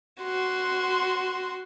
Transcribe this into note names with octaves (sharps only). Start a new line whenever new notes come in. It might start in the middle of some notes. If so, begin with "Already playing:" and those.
F#4 C6